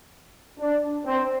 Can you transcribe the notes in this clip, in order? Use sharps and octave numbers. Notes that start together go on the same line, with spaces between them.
D4
C4